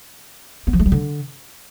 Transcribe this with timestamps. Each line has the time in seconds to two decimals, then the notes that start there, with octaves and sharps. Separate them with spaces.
0.67 B3
0.73 F3
0.79 A3
0.86 G3
0.92 D3